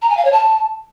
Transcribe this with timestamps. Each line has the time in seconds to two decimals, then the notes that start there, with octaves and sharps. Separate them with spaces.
0.02 A#5
0.10 G#5
0.17 F5
0.25 C#5
0.32 A5